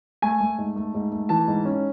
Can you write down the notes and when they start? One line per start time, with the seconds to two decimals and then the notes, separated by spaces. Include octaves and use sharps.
0.22 A3 G#5
0.40 A3
0.58 G#2
0.76 A3
0.94 G#2
1.12 A3
1.29 E3 A5
1.48 G#2
1.65 C#4